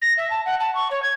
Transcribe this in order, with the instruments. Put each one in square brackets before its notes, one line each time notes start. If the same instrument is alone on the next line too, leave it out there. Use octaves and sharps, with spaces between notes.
[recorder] A#6
E5
A5
F#5
A5
C#6
C#5
G#6